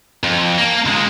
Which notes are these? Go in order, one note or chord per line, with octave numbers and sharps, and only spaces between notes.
F2
A#3
C#2 G#3